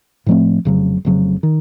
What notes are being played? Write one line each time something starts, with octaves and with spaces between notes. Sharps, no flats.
A2 F3 A3 C4
F1 F2 C#3 F#3
F1 F2 C#3 F#3
D#3